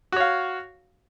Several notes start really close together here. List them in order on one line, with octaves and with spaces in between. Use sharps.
F#4 C#5 F5